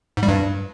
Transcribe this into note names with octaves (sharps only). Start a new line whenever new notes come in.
G#2
G3
G2